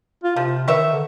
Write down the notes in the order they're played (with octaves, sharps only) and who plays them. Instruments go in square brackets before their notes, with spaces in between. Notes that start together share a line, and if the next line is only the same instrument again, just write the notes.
[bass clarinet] F4
[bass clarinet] C3 [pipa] F3
[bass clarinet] D#3 [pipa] B4 C#5 E5
[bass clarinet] D3